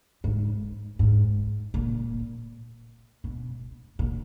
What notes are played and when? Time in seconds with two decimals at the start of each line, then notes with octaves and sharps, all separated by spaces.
0.24 G#2
0.99 G#2
1.74 A#2
3.24 B2
3.99 A#2